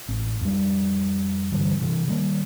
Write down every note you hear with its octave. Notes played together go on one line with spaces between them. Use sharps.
A1 C4
F2 G3
G2 D3 E3 G3
C3 E3
D#3 G3 A#3